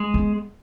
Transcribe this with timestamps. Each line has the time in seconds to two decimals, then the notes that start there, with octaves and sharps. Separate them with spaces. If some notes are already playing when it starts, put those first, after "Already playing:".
Already playing: G#3
0.14 B3